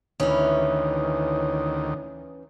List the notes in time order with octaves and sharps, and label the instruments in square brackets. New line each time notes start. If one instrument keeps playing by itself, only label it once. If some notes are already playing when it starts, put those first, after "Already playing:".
[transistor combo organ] D2 D#3 [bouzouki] E3 C#4